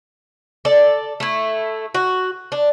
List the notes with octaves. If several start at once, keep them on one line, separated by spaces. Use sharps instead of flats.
A4 D5
A3 E4
F#4
D4